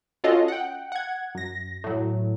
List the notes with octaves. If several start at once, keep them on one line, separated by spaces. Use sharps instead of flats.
C#4 F4 F#4 A4 C#5 D#5
F#5 G5
F#5 G#6
F#2 A#6
A2 F#3